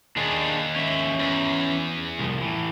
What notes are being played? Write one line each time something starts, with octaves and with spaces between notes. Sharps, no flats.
D#2 D4 G#4
C#4 E5
E2
C2 F3
A2 E3